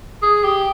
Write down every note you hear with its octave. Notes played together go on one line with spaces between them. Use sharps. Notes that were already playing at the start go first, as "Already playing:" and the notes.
G#4
G4